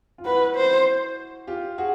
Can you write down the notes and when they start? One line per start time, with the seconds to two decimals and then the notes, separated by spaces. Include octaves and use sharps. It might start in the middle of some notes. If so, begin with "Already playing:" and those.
0.18 F4
0.25 E4 F#4 B4
0.56 C5
1.47 F4 G4
1.78 F#4 G#4